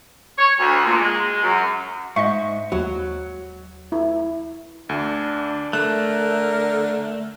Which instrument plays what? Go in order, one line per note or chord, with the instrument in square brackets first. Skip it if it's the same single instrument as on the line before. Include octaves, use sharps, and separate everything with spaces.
[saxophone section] C#5
D2
A#2
G#3
F#2
[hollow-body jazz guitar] G#2 [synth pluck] D#5 E5 [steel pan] C#6
[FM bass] D#2 [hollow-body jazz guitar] F#3
[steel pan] E4
[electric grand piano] D2 [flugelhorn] D4
[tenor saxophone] D3 [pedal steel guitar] A3 [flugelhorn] A#4 [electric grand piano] F#6